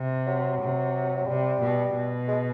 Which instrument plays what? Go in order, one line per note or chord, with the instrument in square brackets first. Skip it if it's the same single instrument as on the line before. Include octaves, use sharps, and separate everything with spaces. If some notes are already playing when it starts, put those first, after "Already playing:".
Already playing: [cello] C3
[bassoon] F#3
[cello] C3
[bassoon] F#3
[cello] C3 [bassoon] G3
[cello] B2
B2
[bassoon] G#3